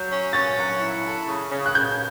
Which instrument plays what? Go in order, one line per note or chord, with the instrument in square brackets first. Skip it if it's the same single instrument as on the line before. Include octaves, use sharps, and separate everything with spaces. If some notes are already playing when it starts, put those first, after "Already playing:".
Already playing: [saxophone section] F#3 [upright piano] G6
[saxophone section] C#4
[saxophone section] C#4 [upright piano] A6
[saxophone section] F#3
E4
A4
C#3
C#3
[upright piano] F#6
[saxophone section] C#3 [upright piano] G6